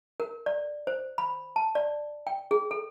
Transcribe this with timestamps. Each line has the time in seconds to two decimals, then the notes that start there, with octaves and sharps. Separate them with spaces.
0.20 A#4
0.46 D5
0.87 C5
1.18 B5
1.56 A5
1.75 D5
2.27 G5
2.51 G#4
2.71 A4